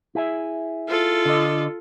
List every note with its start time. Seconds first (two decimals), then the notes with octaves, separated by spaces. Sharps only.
0.15 E4 G#4 E5
0.88 F4 A4
1.26 D3 D#5